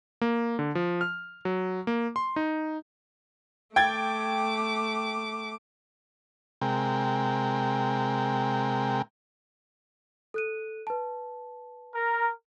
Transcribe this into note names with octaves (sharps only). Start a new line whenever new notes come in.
A#3
D3
F3
F6
F#3
A#3
C6
D#4
A3 G5 D6 G#6 A6
C3 G#3 A#4 G5
A4 F#6 D#7
B4 A5
A#4